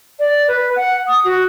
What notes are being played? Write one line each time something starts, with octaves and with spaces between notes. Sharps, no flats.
D5
B4
F#5
D#6
F#4